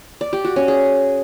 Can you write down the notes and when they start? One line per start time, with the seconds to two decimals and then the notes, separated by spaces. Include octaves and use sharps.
0.21 D5
0.33 G4
0.45 F#4
0.56 C#4
0.68 G#4